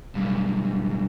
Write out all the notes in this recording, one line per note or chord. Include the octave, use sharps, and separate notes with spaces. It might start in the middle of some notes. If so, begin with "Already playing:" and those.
B1 G2